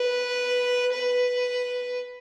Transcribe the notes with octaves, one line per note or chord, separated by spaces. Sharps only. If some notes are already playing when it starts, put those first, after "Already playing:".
Already playing: B4
B4